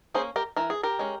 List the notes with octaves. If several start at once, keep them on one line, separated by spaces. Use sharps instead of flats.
A#3 C#4 G#4 C5
G4 A#4
E3 A#4
G#4
G4 A#4
G#3 C#4